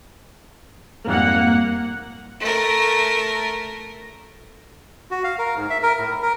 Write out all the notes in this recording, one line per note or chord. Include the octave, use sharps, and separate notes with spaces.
F2 G#2 G3 A#3 F#5
A3 A#4
F#4
F5
A#4
G#2
E5
A#4
A2
A#4